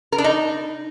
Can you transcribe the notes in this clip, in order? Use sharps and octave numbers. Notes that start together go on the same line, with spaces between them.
A#4
D4
D#4